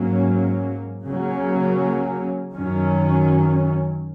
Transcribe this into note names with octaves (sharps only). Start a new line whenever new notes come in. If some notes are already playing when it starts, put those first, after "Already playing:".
Already playing: G#2 F#3 A#3 C#4
C#3 F#3 A#3 C#4
F#2 D#3 F#3 C#4